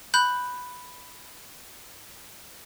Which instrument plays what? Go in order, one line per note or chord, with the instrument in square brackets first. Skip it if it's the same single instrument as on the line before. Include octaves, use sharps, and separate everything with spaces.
[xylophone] B5 F#6 G6